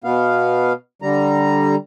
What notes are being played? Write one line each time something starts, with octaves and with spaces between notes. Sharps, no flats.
B2 B3 F5
D3 G3 A#5